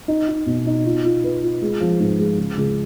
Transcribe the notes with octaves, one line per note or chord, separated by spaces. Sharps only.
D#4
D#4
B2
D#4
F4
F4
B4
F4
G#3
F3
G#2
G#3
C#3
C#2